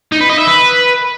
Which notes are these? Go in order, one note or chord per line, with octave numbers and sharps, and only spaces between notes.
D#4
B4
D#5
E5
B4